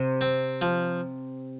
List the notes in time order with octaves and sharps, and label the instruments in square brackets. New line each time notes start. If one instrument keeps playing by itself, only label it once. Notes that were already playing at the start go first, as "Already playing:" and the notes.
Already playing: [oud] C3
[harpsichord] C4
F3